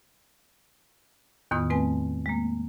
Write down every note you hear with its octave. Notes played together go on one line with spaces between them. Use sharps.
E2 A2 D#3 B3 F4 D#6
A3 C4 B4 G#5
G#3 A#3